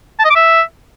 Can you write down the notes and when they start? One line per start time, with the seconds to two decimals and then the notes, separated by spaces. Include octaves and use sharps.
0.19 A5
0.25 D#5
0.30 D6
0.36 E5